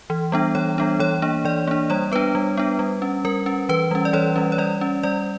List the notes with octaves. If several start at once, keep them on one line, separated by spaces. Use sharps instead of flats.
E3
G3 B3 D4
E3 C#5
G3 B3 D4
E3 C#5
A#3 D4
E3 D5
A#3 D4
G3 C#5
B3 D4 B4
G3
B3 D4
G3
C#4
G3 A#4
C#4
E3 B4
G3 C#4
D5
E3 C#5
G3 C#4
C#5
G3 D5
C#4
G3 D5